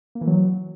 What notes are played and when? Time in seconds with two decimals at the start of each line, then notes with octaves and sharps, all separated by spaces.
0.15 A#3
0.21 E3
0.27 F#3